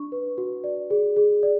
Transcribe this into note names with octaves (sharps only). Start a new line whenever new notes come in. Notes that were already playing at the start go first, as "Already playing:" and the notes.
Already playing: D4 C#6
B4
F#4
D5
G#4
G#4
D5